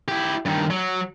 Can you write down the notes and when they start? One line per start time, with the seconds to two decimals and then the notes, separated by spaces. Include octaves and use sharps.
0.08 E4 G4
0.46 G2 D#3
0.70 F#3